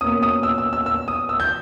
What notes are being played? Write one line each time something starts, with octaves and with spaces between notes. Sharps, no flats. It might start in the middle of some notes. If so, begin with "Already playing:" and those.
B2 A#3 C#4 D#6
D#6
E6
E6
E6
E6
D#6
E6
G6